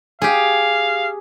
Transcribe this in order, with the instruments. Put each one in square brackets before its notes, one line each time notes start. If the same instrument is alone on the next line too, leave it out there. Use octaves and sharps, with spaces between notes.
[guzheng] G4 G#4 [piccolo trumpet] F5